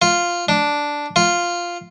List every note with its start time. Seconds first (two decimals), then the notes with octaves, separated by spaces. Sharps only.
0.02 F4
0.49 D4
1.16 F4